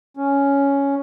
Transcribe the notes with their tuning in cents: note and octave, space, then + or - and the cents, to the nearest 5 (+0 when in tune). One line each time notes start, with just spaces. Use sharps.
C#4 +5